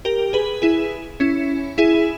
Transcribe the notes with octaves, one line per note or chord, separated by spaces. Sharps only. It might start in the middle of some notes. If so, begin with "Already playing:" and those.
G4 A#4
G#4 B4
E4 G#4
C#4 E4
E4 G#4